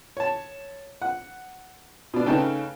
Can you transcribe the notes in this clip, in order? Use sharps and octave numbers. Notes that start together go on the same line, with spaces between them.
C#5 A5
F#5
B2 D4
C#3 A3 D#4 B4 G5 A5